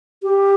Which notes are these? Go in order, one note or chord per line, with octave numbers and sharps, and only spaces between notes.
G4